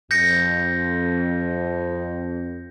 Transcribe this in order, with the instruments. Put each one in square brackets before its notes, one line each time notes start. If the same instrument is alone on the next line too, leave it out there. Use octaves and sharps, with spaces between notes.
[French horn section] F2 [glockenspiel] G6 A#6 C#7